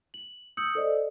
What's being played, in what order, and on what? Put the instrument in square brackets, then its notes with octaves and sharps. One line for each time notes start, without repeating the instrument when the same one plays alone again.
[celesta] F#7
D#6 E6 G6 C#7 F#7
A4 C5 D5 D#5